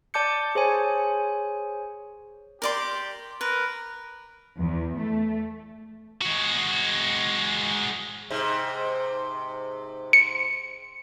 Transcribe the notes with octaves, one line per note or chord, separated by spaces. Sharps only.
D5 A5 D6 G6 C#7
G#4 C5 C#5 G#5
G4 A#4 D5 C6
A#4 B4
E2
A3
G#3 F#4
G#2 C3
C#7